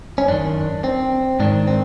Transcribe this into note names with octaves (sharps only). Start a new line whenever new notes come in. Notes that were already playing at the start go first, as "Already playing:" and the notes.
C#4
F#2 D#3 D4
C4
G#2 D#3 D4
C4